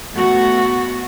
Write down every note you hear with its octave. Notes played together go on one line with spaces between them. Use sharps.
A3 B3 F#4